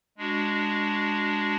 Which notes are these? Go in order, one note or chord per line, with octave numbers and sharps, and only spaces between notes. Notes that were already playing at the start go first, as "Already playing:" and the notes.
G#3 D4 F#4